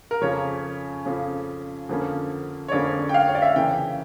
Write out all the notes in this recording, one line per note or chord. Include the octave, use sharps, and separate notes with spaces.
A#4
F2 C#3 F3 C#4 C#5
F2 C#3 F3 C#4
F2 D3 F3 A#3 C#4
C#5
F2 D3 F3 A#3 C#4 D5
G5
F5
C#5
D5
E5
F5
C#3 E3 A#3 G5